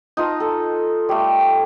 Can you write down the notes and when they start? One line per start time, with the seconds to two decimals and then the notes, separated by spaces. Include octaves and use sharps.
0.17 D#4 F4 A5 A#5
0.40 A4
1.09 G3 A3